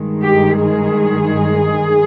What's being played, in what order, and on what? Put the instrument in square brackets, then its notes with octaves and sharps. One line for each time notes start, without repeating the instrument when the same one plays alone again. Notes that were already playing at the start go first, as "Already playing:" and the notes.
Already playing: [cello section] G2 D#3 G#3
G4
G#4